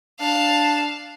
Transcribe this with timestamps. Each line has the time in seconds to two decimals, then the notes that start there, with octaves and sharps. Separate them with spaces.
0.20 D4 F5 A5